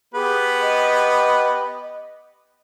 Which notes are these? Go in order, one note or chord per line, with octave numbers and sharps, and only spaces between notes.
B3 G4 G#4 B4
D#5